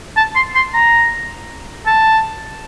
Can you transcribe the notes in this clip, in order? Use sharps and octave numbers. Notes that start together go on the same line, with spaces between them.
A5
C6
C6
A#5
A5